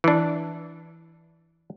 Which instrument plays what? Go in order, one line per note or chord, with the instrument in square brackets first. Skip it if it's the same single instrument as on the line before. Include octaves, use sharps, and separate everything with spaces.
[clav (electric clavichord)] E3 D4